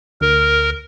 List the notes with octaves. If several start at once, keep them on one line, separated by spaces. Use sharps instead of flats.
D2 A#4